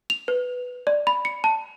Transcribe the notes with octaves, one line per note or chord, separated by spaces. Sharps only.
F7
B4
D5
B5
C#7
A5